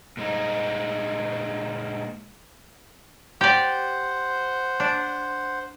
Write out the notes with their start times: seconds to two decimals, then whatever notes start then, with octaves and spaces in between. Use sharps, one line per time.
0.17 A#2 G#3 D#4
3.41 G4 C5 D5 F#5
4.80 D4